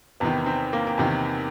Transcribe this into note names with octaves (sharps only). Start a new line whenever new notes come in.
E2 C3 D#3 B3
C4
A#3
A#3
E2 C3 D#3